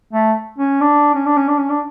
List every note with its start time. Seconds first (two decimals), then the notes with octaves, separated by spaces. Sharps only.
0.13 A3
0.58 C#4
0.81 D4
1.15 C#4
1.26 D4
1.37 C#4
1.48 D4
1.58 C#4
1.70 D4